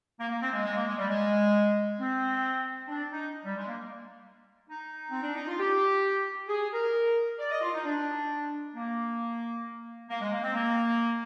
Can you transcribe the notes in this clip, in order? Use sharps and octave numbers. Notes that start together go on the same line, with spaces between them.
A#3
A#3
C4
G#3
G#3
A#3
G#3
G3
G#3
C4
D4
D#4
G3
G#3
A#3
D#4
C4
D4
D#4
F4
G4
G#4
A#4
D5
D#5
F4
D#4
D4
A#3
A#3
G#3
A#3
C4
A#3